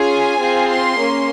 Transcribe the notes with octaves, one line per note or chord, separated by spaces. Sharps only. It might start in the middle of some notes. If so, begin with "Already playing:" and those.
Already playing: C#4 F4 G#4 G#5
C4 F4 G#4
C6
A#3 C#4